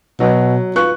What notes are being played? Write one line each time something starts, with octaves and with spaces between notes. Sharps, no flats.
B2 F#3
F4 B4 C#6 F#6